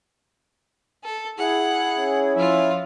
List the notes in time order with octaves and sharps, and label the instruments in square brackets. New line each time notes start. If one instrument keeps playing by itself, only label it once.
[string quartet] A4
[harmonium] E4 G#4 [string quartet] F#5
[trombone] C#4
[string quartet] F3 F4 [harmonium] E4 E5